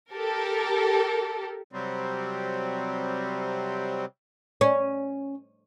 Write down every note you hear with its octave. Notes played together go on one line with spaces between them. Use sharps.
G4 A4 A#4
C3 F#3 G3 C4
C#4